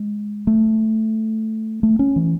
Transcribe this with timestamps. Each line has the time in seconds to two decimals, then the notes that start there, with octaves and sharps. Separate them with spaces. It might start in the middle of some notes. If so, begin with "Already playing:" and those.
Already playing: G#3
0.47 A3
1.83 A3
1.99 C#4
2.16 E3